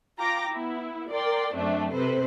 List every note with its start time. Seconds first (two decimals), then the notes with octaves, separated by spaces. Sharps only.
0.18 F4 G5 A#5 D6
0.50 B3 E4
1.11 A#4 D5 G5 C6
1.54 F#2 A3 C4 D4
1.92 C3 A4 B4 C5